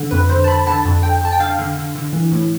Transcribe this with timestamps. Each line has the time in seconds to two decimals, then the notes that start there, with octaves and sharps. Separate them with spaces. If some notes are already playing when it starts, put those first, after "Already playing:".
Already playing: D3
0.11 F2 B4
0.29 D3 C5
0.44 A5
0.47 D3 B5
0.67 D3 A5
0.85 F2
1.02 F2 G5
1.21 F2 A5
1.32 G5
1.40 D3 F5
1.59 D3
1.76 D3
1.95 D3
2.13 E3
2.32 A2